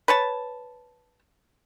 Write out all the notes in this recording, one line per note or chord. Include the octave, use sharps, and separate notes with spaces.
B4 C#5 A5